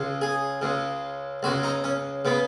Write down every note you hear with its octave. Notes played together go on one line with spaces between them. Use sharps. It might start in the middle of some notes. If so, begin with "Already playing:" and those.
Already playing: C#2 C#3
G#4
C#2 C#3
C#2 C#3 F#4
D#4
C#4
C#3 B3